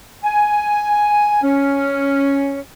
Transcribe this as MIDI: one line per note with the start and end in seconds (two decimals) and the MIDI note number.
0.23 1.41 80
1.42 2.59 61